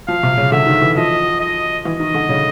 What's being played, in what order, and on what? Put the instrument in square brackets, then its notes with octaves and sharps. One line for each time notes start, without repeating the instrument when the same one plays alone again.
[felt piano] F3 [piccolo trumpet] F5
[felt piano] C3
C#3
[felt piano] D3 [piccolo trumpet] E5
[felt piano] D#3
E3
[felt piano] F3 [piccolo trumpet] D#5
[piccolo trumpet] D#5
[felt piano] E3 [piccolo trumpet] D#5
[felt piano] D#3
D3
C#3